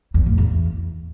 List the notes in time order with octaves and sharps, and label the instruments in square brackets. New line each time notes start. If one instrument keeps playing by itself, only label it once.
[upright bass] E2
A2
E2